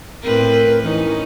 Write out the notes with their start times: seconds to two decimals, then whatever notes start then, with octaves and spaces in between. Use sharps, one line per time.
0.23 A2 C4 A#4 B4
0.82 E3 C#4 D#4